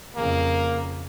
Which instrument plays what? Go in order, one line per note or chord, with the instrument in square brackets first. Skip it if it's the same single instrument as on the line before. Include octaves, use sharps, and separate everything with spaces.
[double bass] F2 C#3 [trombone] A#3